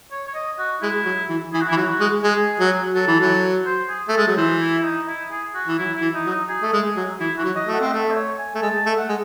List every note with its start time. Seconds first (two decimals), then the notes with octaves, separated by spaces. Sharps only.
0.11 C#5
0.27 C#5
0.35 D#5
0.59 F#4
0.82 G#3 E4
1.05 F#3
1.30 E3
1.53 E3 G#4
1.61 F#4
1.68 E4
1.72 E3
1.76 F#3 F#4
1.88 F#4
2.00 G#3
2.23 G#3 G#4
2.60 F#3
2.94 F#3 A4
3.08 E3
3.20 F#3
3.66 C5
3.89 G#4
4.09 A3 A4
4.17 G#3
4.27 F#3
4.36 E3 C5
4.60 E4
4.79 E4
4.83 D#4
5.07 E4
5.31 G#4
5.55 F#4
5.67 E3
5.78 F#3 E4
5.96 E4
6.01 E3
6.14 D#4
6.26 F#3
6.31 D#4
6.49 G#4
6.62 A3
6.73 G#3
6.96 F#3
7.20 E3 E4
7.38 E3 F#4
7.44 F#3
7.56 D#5
7.67 A3
7.74 F#5
7.81 C4
7.86 D#5
7.91 A3 E5
8.11 C5
8.15 C#5
8.38 G#5
8.55 A3
8.62 G#3 A5
8.86 A3
8.97 F#5
9.09 G#3